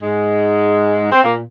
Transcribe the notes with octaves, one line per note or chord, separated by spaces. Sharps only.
G#2 G#3
C4
A#2 A#3